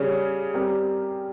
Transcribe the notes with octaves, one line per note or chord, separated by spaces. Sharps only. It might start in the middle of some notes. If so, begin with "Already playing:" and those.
Already playing: C#3 G3 C#4 G#4
G3 C4 G4 A#4